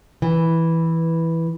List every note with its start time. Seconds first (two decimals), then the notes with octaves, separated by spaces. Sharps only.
0.22 E3